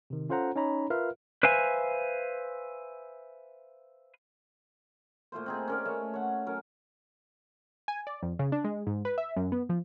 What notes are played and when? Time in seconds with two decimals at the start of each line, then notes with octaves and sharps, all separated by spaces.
0.10 C3 D#3
0.29 C#4 F4 A4 C5 F#5 A#5
0.56 C#4 D#4 C#5 A#5 B5
0.90 F4 A#4 B4 E5 F5 F6
1.43 B4 C5 E5 F5 G#5
5.32 A#2 A3 F4 C5
5.46 C4 D#4 G#4
5.68 C#4 A#4 D5
5.85 A3 C#5 A5
6.14 C#5 F#5
6.46 F#3 C#4 A#4
7.88 G#5
8.07 D5
8.23 F2
8.39 C#3
8.52 D4
8.64 G#3
8.87 G#2
9.05 B4
9.18 E5
9.36 F#2
9.52 B3
9.69 F3